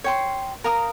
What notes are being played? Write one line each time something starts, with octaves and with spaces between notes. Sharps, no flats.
C#5 G5 C6
A#4 F5 A#5 D#6